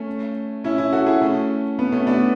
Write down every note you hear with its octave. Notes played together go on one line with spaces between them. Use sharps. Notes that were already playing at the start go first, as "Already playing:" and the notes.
Already playing: A3 C#4
C#4 E4
C#4 E4
F#4 A4
E4 G#4
A3 C#4
B3
A3 C#4
B3 D4